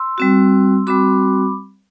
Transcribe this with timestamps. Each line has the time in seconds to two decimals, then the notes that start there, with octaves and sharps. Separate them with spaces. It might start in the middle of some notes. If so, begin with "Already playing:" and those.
Already playing: C6 E6
0.18 G3 C4 F#4
0.87 G3 C4 F#4 B5 D6